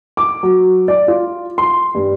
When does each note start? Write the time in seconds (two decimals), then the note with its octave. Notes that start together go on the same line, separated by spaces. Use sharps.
0.17 D6
0.43 F#3
0.88 D5
1.08 F4
1.58 C6
1.95 G2